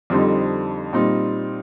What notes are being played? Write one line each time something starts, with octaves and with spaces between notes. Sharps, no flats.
F2 D3 G3 C4 D#4
A#2 G3 C4 D#4